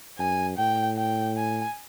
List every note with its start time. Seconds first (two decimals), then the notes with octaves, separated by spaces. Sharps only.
0.19 F#2 G#5
0.58 A2 G5
0.98 G5
1.37 G#5